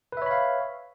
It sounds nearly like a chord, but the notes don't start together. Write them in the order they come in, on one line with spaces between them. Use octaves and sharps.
B4 E5 C#5 B5 F5